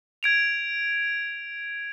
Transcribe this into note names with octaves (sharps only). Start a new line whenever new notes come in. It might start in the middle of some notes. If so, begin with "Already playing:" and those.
G#6 D7 F7